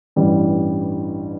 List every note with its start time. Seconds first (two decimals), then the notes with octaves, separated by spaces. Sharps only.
0.16 A1 G2 E3 G3